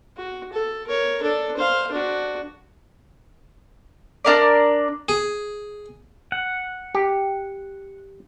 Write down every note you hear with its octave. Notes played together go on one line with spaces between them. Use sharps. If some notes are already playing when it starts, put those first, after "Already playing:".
F#4
A4
A#4 C#5
D4 A4
C5 F5
D4 F#4
D4 A#4 D5
G#4
F#5
G4